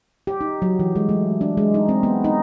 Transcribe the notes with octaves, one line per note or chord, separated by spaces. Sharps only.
G4
D#4
F#3
E3
G#3
A3
D4
G#3
D#4
C4
B3
D#4